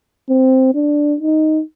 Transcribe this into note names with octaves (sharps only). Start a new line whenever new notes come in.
C4
D4
D#4